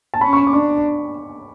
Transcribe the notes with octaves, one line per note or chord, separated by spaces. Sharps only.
A5
C#4 B5
C#6
B5
D6
D4 C#6